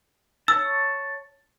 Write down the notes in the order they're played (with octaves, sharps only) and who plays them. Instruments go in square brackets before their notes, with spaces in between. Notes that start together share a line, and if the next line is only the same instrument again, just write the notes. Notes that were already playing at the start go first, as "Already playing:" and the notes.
[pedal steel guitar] C#5 A5 [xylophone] E6